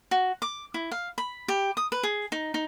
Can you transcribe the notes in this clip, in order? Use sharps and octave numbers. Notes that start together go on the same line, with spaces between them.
F#4
D6
E4
F5
B5
G4
D#6
B4
G#4
D#4
D#4